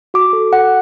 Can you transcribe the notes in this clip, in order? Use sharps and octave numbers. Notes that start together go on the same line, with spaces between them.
F#4 D6
A4
F#4 F#5